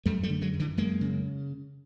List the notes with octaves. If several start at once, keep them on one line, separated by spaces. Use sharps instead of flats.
F#2 G3 A3
G3 A3
D3
F#3 G#3
F#2
D3 E3
F#2 G#3 A#3
C#3